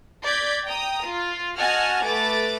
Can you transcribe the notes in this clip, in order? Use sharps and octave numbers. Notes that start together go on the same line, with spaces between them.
D5 D6 G6 G#6 B6
G5 A#5 D#6
F4
F#4 D#5 F#5 G#5 A5 F6
A3 B4 D6 A6